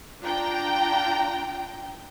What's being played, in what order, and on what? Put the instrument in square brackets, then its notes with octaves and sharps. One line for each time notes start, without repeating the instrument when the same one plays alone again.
[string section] D4 F4 G5 A#5